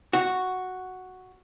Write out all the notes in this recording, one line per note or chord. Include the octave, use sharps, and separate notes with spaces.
F#4